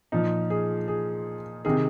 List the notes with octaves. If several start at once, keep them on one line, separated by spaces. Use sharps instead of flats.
A#2 F3 D#4
G#4
G#4
C3 D#3 G#4